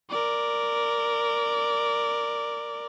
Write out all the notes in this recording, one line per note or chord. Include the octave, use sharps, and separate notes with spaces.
A#4 D5